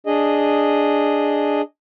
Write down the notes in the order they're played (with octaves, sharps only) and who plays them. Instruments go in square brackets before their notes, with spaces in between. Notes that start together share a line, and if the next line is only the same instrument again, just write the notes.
[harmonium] D4 G#4 D#5